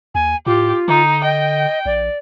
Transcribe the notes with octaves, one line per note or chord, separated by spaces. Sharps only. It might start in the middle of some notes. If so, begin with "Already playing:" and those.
D#2 G#5
A2 F4 G4
D3 D#4
D#5 G5
A#1 D5